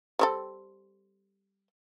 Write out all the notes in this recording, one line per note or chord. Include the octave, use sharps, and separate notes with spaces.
G3 C4 A4